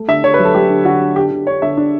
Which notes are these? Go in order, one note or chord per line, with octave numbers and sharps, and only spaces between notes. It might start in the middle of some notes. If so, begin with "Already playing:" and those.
Already playing: A3
D3 E5
D3 C#5
B4
F#3
A4
F#3 G4
D3
D3 F#4
D3
D3 G4
D3
D4 C#5
D3 E5
D4